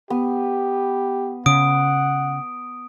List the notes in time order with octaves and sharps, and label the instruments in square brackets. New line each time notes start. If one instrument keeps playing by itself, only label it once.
[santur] B3 [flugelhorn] G4
[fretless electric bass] C#3 [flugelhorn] F#5 [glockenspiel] D#6 D7